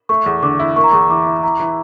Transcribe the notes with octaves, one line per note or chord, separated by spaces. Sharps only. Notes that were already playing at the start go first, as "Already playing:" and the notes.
A3 C#6
E2
D3 D6
E4
A#3 C#6
A#5
E2 C#6
E3 D6
E4
E4 A#5
E3